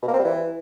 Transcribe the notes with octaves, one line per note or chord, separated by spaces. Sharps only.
B2
A#3
C4
G3
E3